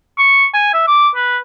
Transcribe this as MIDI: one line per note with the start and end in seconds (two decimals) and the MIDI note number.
0.19 0.46 85
0.54 0.71 80
0.74 0.85 76
0.88 1.09 86
1.16 1.38 71